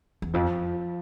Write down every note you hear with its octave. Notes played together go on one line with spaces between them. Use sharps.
E2
F2 F3